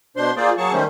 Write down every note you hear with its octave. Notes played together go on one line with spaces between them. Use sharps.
B2 D4 C5 C6
A#3 F4 G#4 C5 D5
F#3 A#3 G#4 A5 C#6
D#3 G3 A3 C#4 C5